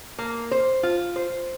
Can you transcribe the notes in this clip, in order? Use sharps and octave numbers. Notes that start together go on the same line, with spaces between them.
A#3
C5
F4
C5